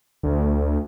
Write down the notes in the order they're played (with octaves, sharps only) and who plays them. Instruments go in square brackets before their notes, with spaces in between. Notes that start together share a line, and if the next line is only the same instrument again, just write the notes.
[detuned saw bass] D2